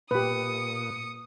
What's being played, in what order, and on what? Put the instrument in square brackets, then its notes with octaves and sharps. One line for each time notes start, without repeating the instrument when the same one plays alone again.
[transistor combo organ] A#2 [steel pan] G4 B4 [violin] D#6 C#7